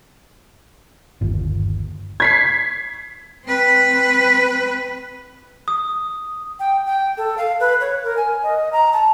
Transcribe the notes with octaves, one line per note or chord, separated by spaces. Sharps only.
G1 D#2
G#6 B6 C7
C4 B4
D#6
G5
G5
A4
F5
B4
C#5
A#4
G#5
D#5
A#5
A5